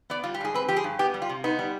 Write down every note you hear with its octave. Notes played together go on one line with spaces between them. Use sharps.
B3 D5
G3 F4
G4
G#2 G#4
C4 B4
F3 G4
G#4
G2
B3 G4
G3
F4
C3
B3 D#4
G3